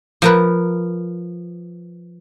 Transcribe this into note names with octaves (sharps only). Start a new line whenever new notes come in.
F3 A#4 B4